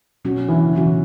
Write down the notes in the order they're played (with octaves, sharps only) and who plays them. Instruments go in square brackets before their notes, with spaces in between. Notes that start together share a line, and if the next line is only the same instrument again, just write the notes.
[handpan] B2 F#3 C#4 F#4
[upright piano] E3
[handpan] B2 F#3 C#4 F#4 [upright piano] E3